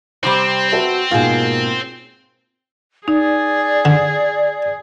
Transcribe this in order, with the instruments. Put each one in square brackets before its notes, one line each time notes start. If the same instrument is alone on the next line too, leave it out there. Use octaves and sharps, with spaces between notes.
[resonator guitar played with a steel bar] A2 C3 G3 [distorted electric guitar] C4 [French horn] C5
[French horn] F#4 [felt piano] B4 E5 A5
[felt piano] G#2 B2 [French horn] A#3 [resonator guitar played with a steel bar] F4 G#4
[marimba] D#4 [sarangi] G#4 [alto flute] D5
[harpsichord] D3